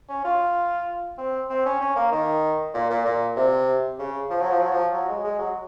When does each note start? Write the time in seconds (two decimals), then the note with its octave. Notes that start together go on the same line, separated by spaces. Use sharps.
0.09 C#4
0.24 F4
1.18 C4
1.50 C4
1.65 C#4
1.81 C#4
1.96 A#3
2.12 D#3
2.74 A#2
2.90 A#2
3.05 A#2
3.36 C3
3.99 C#3
4.30 F3
4.41 F#3
4.50 F3
4.61 F#3
4.72 F3
4.93 F#3
5.08 G#3
5.24 G#3
5.39 F#3